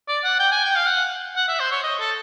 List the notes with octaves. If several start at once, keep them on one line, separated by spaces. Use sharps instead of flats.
D5
F#5
G5
G#5
G5
F5
F#5
F#5
E5
C5
C#5
D#5
A4